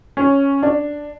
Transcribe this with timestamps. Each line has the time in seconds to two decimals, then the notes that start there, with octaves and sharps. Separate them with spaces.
0.17 C#4
0.63 D4